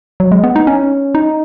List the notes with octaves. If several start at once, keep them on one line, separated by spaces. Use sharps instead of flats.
F#3
G#3
B3
D#4
C#4
D#4